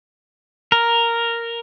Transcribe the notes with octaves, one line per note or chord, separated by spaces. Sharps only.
A#4